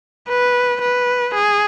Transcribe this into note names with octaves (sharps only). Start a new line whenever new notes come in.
B4
B4
G#4